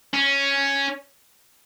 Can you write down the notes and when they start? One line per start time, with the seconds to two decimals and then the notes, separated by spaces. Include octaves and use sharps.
0.14 C#4